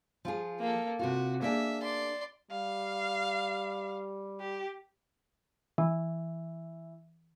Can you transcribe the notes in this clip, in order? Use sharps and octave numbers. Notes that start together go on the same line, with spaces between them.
F3 F4 G#4
A#3 A4
C3 F4 F#4
A#3 D4 G#4 E5
D5 C6
G3 F5
G4
E3